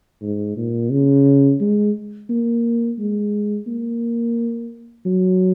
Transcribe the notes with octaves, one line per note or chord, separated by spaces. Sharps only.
G#2
A#2
C#3
G#3
A#3
G#3
A#3
F#3